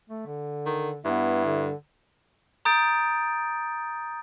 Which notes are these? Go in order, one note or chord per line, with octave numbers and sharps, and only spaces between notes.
A3
D3
D#3
G2 B3 E4
D3
A#5 D#6 G6 A6 D7